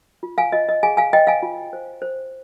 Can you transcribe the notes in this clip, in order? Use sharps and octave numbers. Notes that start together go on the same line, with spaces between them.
F4
F5 G#5
F4 D#5
D#5
G#4 F5 G#5
F5 G#5
C5 D#5 G5
F5 G#5
F4
C5
C5